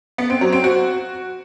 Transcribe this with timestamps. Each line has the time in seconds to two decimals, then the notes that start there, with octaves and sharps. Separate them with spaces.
0.18 B3
0.30 C4
0.41 F#3
0.52 C4
0.64 F#4